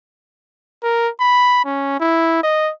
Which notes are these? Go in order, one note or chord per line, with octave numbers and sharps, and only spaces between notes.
A#4
B5
C#4
E4
D#5